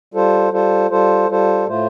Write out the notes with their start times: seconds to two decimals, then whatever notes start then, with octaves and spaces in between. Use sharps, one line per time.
0.14 G3 F4 A4 C5
0.52 G3 F4 A4 C5
0.90 G3 F4 A4 C5
1.29 G3 F4 A4 C5
1.67 A2 A3 F4 C5